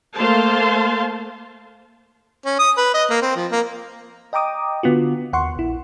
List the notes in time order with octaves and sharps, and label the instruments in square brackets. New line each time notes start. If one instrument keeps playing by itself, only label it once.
[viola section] A3 A#3 C5 F5 A5 C6
[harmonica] C#4
D#6
B4
D#5
A#3
C4
F3
A#3
[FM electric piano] D#5 G5 A#5 D6 D#6
D3 B3 F4 F#4
D#2 F#5 C6 C#6
A#1 E4